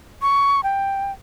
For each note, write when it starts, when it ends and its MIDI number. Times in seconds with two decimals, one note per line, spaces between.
0.22 0.61 85
0.63 1.12 79